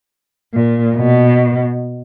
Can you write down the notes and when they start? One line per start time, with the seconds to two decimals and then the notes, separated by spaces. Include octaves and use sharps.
0.53 A#2
0.97 B2